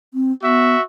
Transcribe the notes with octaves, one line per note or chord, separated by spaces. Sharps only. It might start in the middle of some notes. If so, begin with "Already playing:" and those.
C4
B3 F#4 E5